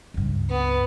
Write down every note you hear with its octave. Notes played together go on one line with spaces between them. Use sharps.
C#2 G2
B3